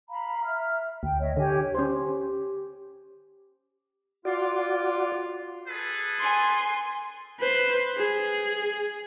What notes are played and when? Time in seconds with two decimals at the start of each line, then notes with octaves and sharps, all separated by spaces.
0.10 F5 A#5 B5
0.44 E5 F6
1.03 D2 G5
1.20 C#5 D#5 E5
1.37 D3 G4 C#5 G#5
1.75 C#4 G4 C5
4.25 F4 F#4 D5
5.68 G#4 A4 B4
6.19 G#5 C6
7.40 B4 C5
7.97 G#4